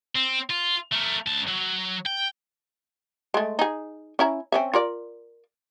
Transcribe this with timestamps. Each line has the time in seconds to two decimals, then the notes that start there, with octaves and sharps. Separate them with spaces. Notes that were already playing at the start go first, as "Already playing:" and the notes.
0.15 C4
0.50 F4
0.92 A3 A#4
1.26 C#2 A5
1.47 F#3
2.06 G5
3.34 G#3 A3
3.59 D#4 G#4
4.19 C#4 E4 A#5
4.52 C4 C#4 E5
4.74 F4 A#4 D5